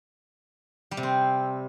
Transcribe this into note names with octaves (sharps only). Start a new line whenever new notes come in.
G3
C3
C4